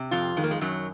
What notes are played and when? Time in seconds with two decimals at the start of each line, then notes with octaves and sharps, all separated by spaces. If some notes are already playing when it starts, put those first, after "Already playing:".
Already playing: C3
0.11 F2 F4
0.37 D#3 G#3
0.44 A#3
0.51 G#3
0.61 F#2 F#3